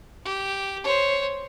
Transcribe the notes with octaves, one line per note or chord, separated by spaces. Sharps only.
G4
C5 C#5